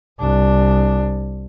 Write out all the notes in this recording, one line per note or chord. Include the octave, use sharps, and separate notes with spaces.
C2 D4